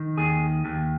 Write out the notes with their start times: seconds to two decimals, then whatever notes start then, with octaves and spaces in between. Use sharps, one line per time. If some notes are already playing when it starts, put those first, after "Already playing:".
Already playing: D#3
0.17 D#2 G#4
0.65 D#2